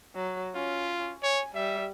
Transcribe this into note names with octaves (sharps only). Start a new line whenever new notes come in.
F#3
C#4 F4
C#5 G#5
G3 E5